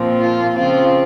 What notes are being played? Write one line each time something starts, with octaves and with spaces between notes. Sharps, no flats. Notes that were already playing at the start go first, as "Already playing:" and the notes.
Already playing: A#2 F3 C4
F4
C#3 F3 C4 F4